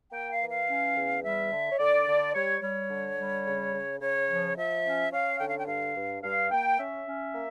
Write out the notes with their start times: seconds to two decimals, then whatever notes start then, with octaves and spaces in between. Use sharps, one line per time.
0.12 A#3 G5
0.32 F5
0.40 E3
0.50 F5
0.68 C#4
0.96 E2
1.23 G3 E5
1.51 D3
1.71 C#5
1.79 D3 D5
2.07 D3
2.35 G3 C#5
2.62 G3 C#5
2.90 D3
3.18 G3
3.45 C#3
3.73 C#3
4.01 C#3 C#5
4.29 F3
4.57 F3 E5
4.85 C#4
5.12 C#4 F5
5.40 D3 G5
5.49 F5
5.59 G5
5.67 G2 F5
5.95 G2
6.23 G2 F5
6.51 A#3 G5
6.79 C#4 E5
7.06 C#4
7.34 A#3